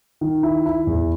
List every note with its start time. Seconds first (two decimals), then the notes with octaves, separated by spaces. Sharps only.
0.21 D#3
0.43 E4
0.66 E4
0.87 E2